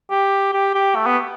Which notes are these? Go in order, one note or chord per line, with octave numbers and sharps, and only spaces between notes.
G4
G4
G4
A3
B3